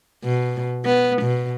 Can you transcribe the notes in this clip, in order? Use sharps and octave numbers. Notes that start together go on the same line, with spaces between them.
B2
B3
B2